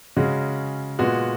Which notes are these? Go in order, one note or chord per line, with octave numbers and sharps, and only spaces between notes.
C#3 G#3 C#4 F#4
A#2 G#3 B3 F#4